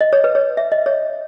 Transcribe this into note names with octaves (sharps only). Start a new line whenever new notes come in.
D#5
C#5
B4
C#5
E5
D#5
C#5